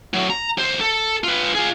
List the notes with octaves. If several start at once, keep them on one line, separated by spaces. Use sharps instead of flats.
A2 F#3
A#5
D#2 C5
A4
F4 B4
F4 G#4